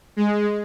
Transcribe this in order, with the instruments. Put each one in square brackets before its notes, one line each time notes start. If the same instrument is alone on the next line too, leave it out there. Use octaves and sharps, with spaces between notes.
[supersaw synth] G#3